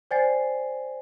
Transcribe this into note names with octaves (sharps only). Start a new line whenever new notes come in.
C5 D5 G5 G#5 A6 C7